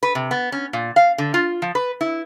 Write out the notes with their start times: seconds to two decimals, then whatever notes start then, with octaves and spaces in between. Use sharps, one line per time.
0.03 B4
0.15 C3
0.31 B3
0.52 C#4
0.73 A#2
0.96 F5
1.18 D3
1.34 F4
1.62 F3
1.75 B4
2.01 E4